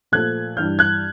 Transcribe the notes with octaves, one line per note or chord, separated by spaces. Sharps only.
A#2 F3 A3 F#6 G#6
G2 E3 G3 F6 G6
F#6 G#6